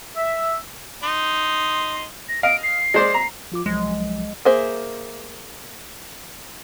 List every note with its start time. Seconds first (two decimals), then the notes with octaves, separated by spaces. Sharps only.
0.16 E5
1.03 D#4 C6
2.29 A#6
2.43 D#5 F5 D7
2.63 C7
2.94 G#3 C5 D5
3.14 A#5
3.52 F3 F4 D6
3.66 C2 F3 F#3 G#3
4.45 A#3 G#4 C5 E5